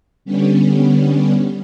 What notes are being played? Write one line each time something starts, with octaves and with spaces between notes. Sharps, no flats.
D3 G3 B3 C#4